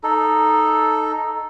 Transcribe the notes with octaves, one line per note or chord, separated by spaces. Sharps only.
D#4 A4